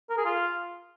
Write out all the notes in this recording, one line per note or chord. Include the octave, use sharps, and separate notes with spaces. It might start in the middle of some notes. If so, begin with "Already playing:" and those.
A#4
G#4
F4